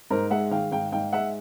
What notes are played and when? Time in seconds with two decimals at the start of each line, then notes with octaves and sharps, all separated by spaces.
0.11 G#2 A#4 C5
0.30 G#3 E5 F#5
0.51 D#3 F5 G5
0.71 G#2 F5 G5
0.92 G#2 F5 G5
1.13 G#3 E5 F#5